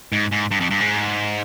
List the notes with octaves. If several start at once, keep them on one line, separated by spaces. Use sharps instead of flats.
G#2
G#2
G2
F2
G2
G#2